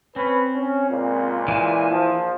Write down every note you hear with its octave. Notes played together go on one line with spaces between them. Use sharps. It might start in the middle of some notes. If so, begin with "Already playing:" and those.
C4 C#4 B4
C#4
C#2 A#2
E3 G#5
A#1 F3